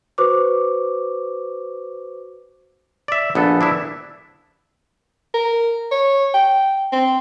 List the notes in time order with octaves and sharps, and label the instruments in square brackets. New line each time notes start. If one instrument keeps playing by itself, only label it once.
[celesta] F#4 B4 C5 C#6 D6
[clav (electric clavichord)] D5 E5
A#1 B3 A4
D4 E4 E5
[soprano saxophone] A#4
C#5
G5
C4